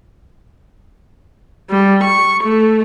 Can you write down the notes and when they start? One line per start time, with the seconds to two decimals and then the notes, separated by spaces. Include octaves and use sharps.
1.70 G3
2.04 C#6
2.43 A3